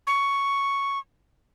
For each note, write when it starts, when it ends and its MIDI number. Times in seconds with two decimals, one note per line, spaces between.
0.07 0.99 85